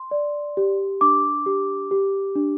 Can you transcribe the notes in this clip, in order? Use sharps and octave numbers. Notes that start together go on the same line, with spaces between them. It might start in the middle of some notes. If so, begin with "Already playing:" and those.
Already playing: C6
D5
G4
D4 D6
G4
G4
D4